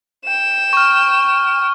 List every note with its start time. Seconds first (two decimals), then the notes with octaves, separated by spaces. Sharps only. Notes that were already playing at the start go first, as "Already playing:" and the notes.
0.24 G5 E7
0.73 C#6 F6